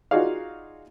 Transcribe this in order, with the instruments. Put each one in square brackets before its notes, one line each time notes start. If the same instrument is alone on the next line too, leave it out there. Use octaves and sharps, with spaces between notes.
[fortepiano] D#4 F4 F#4 G#4 D5 F5